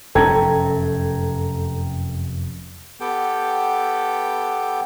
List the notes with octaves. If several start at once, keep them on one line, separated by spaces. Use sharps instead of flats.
F1 F#2 C#4 A4 G5 A#5 G#6
B3 G4 A4 G5